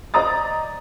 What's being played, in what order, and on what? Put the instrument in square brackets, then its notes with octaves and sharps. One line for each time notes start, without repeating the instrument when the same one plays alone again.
[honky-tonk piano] C5 D5 D#5 A#5 D#6 A6